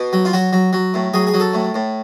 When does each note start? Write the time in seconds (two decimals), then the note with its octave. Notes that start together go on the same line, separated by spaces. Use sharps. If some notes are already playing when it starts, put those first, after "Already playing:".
Already playing: B2
0.13 F#3
0.25 F4
0.33 F#3 F#4
0.53 F#3
0.73 F#3
0.94 A2
1.14 F#3 G#4
1.27 G#4
1.34 F#3
1.40 A4
1.54 A2
1.74 A2